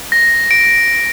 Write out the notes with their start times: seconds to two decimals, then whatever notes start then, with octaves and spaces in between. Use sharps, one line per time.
0.12 A#6
0.51 D7